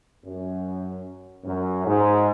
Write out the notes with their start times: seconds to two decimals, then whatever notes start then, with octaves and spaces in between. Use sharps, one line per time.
0.25 F#2
1.45 F#2
1.85 G#2